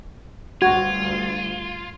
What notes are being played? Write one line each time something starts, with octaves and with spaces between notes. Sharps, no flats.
D2 G2 G3 F4 F#4 G#6